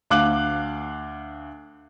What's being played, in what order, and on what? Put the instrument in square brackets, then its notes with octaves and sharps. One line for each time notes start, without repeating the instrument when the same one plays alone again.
[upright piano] D2 F5 D6 F#6 F#7